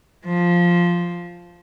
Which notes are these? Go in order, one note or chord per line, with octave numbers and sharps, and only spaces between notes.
F3